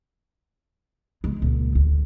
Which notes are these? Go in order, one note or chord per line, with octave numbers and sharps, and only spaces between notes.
C3 G#3
C#2 A#2
D2